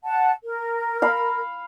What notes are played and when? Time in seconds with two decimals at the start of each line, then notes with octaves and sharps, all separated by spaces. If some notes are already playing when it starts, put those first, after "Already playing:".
0.05 F#5 A5
0.44 A#4
1.02 F5 B5